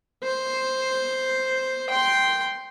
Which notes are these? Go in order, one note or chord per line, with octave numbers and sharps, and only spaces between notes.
C5
G5 C6